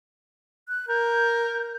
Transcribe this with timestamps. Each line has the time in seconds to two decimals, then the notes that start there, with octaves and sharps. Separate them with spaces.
0.68 F#6
0.88 A#4 G6